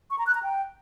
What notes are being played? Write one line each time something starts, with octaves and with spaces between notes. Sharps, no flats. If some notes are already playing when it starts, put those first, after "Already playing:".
C#6
A#5
F#6
A#5
G5